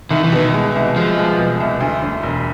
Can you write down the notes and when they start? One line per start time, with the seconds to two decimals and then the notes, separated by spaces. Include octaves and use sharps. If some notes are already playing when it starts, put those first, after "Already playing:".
0.10 C2 D#3
0.24 E3
0.32 B2 D#3
0.54 G#3
0.75 C2
0.96 F3 G#3
1.18 G#3
1.38 B2
1.60 C2
1.80 D2
2.02 D2
2.23 E1